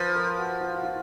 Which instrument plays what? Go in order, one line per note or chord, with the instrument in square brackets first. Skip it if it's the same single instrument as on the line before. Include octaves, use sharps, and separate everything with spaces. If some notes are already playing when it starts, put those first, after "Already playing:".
Already playing: [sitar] F3 [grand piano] B4
[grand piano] A#4
F#4
F4
F#4
F4